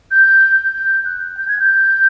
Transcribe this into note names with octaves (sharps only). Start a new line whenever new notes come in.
G6
G6
F#6
G6
G#6
G6